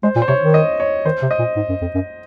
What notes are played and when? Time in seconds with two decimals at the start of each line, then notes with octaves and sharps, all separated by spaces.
0.03 G#3 C5
0.16 A#2
0.22 C5
0.28 C3 C#5
0.41 D#3
0.54 D#5
0.80 C#5
1.05 D#3 C5
1.22 C3
1.31 D#5
1.39 A#2
1.56 G#2
1.69 F#2
1.81 F2
1.94 F#2